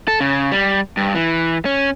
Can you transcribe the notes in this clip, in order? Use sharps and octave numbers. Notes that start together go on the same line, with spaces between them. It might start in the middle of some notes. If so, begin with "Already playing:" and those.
A4
C#3
G3
G2
E3
C#4